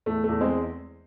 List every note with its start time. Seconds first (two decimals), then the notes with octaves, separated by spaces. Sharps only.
0.06 E2 A3
0.24 E2 A3
0.41 G#3 C4